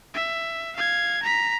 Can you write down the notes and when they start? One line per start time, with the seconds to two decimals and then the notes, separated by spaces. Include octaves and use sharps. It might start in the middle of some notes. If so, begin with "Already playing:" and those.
0.14 E5
0.76 F5 G#6
1.22 A#5 B6